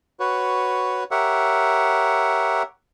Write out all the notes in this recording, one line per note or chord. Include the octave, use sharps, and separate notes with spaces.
F#4 B4 C#5
G4 A#4 C#5 E5 F#5